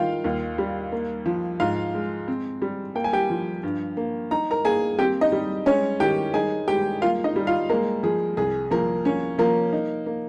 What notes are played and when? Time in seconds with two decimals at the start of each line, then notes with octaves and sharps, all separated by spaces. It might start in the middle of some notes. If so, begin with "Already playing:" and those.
Already playing: D#3 F4 F5 G5
0.24 D#2
0.58 G3
0.92 A#3
1.26 F3
1.60 G#2 F4 F5
1.94 G#3
2.28 C4
2.62 G3
2.95 A#3 G5
3.04 G#5
3.13 G4 G5
3.30 F3
3.63 G2
3.97 A#3
4.31 D#4 A#5
4.51 A#4 A#5
4.65 A#3 G#4 G#5
4.99 C4 G4 G5
5.21 D#4 D#5
5.32 G3
5.66 G#3 C#4 C#5
6.00 D#3 G4 G5
6.34 D#4 G#4 G#5
6.68 G#3 G4 G5
7.02 A#3 F4 F5
7.24 D#4 D#5
7.36 G3
7.47 F4 F5
7.70 G#3 A#3 A#4
8.03 F3 G#4
8.37 C2 G#4
8.71 F3 A#3 A#4
9.05 A#3 C#4 C#5
9.38 F3 A#3 A#4
9.73 D#4
10.06 A#3